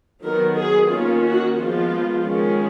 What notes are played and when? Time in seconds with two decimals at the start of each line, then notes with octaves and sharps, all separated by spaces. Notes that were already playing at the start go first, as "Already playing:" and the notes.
0.23 D#3 F#3 B3 A#4
0.56 G#4
0.89 D#3 A#3 C#4 F4
1.24 F#4
1.57 F3 G#3 B3 F4
2.24 D#3 G#3 C#4